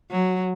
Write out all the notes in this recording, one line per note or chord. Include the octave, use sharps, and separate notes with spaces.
F#3